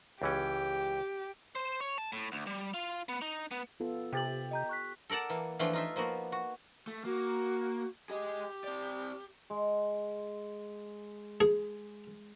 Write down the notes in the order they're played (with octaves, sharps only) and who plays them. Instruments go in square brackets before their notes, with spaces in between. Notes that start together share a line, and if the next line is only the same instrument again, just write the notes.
[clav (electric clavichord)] C#2 E3 C#4 [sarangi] G4
[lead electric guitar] C5
C#5
A5
A2
D2
G3
F4
B3
D#4
B3
[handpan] B3 F4 A4
[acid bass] C3 [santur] G4 [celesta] C5 A6 F#7
[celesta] D#5 A#5 G6
C#6 F#6 B6
[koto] A4 A#4 D5 F#5 A5
E3 A#3
E3 F3 A3 D4 F4 G5
D#4 F4 E5
F3 A#3 B3 F#4
F#4
[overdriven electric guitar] A3
[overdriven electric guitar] A#3 [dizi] F#4
[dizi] G4 [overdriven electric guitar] G#4 D#5
[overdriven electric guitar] C4 D5
[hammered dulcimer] G#3
[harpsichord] G#4